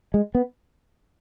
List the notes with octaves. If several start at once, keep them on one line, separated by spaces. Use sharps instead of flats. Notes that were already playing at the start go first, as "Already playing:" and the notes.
G#3
B3